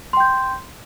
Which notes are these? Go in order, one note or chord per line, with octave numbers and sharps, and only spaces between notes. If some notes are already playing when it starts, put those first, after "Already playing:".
G5 C6 G6